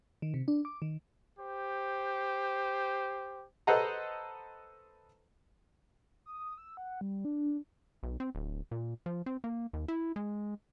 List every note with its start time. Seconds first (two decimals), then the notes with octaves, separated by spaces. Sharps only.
0.22 D#3
0.34 C3
0.48 D4
0.65 D6
0.82 D#3
1.40 G4 C5
3.67 A4 B4 C5 D#5 F#5 A#5
6.26 D#6
6.58 E6
6.77 F#5
7.01 G3
7.25 D4
8.03 B1
8.20 C4
8.35 D1
8.71 A#2
9.06 F3
9.26 C4
9.44 A#3
9.73 D#2
9.88 E4
10.16 G#3